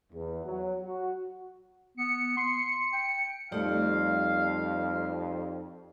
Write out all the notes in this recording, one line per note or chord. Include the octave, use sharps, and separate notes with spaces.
E2
F#3
F#4
B3 C#7
C6
G5
F2 G3 A3 D#4 G4 D5 F5